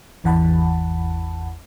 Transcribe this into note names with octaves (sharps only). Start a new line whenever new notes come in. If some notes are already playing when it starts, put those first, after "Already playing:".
G#1 E2 E3 F#5 A5 B5